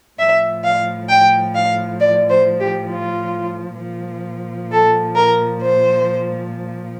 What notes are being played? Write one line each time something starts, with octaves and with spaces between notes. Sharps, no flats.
A2 F3 E5
F5
G5
F5
D5
C5
G4
F4
A#2 F3
A4
A#4
C5